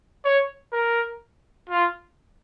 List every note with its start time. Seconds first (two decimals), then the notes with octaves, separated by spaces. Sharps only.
0.25 C#5
0.73 A#4
1.70 F4